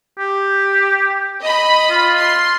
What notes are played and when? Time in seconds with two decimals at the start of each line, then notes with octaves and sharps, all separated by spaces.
0.19 G4
1.43 D#5 B5
1.90 F4
2.20 C6